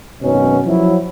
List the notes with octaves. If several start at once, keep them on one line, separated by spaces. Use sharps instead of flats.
G#1 F#2 B2 F#3 C#4 D#4
F3 F#3 E4